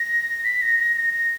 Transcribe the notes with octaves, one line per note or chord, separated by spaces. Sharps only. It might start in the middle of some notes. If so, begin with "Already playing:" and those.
Already playing: A#6
B6
A#6
A#6
A#6
A#6